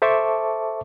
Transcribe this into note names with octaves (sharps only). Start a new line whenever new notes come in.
A4 C5 E5 A5 C#6 D6